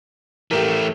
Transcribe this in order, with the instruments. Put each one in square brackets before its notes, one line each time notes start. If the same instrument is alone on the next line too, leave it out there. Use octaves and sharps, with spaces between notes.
[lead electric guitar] E3 A3 [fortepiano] G4 A#4